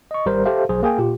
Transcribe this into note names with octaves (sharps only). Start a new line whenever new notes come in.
D#5 C#6
G#1 G3 A#4 C5
G4 A4 C5 E5 F5
B1 F#3 G#4 C5
A#3 G#4 G5 G#5
A#2 F4 G4